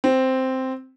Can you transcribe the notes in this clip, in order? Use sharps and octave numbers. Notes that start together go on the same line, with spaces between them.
C4